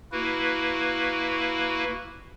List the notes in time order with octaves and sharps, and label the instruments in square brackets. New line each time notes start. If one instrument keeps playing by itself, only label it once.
[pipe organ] A#3 E4 F#4 B4